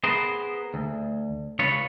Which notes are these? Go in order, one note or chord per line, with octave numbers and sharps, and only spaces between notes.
B3 G#4 A#4 C5
D2
C#2 F4 B4 C#5